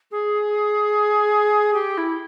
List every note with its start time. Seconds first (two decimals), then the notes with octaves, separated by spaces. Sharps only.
0.11 G#4
1.73 G4
1.97 E4